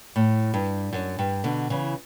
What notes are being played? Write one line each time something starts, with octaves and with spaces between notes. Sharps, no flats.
A2
G2
F#2
G2
B2 D3
C#3 E3